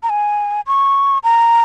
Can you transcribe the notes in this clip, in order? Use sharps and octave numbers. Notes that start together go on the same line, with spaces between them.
A#5
G#5
C#6
A#5